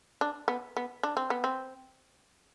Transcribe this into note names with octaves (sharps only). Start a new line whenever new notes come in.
D4
B3
B3
D4
C4
B3
C4